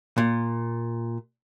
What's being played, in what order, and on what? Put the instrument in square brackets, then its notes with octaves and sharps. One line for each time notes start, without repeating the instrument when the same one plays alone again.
[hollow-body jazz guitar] A#2